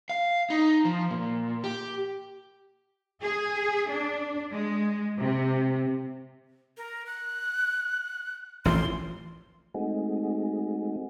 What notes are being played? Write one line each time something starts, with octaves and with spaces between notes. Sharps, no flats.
F5
D#4
F3
A#2
G4
G#4
D4
G#3
C3
A#4
F#6
A1 E3 F3 C6
G#3 A3 C4 D#4 F#4 G#4